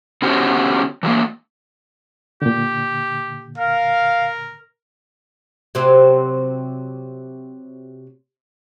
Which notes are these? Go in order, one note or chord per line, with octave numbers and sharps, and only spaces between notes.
D3 B3 C#4 F#4 G4 C5
E3 F#3 A3 A#3
A#2 D3 G4
A#4 F5
C3 F#3 C4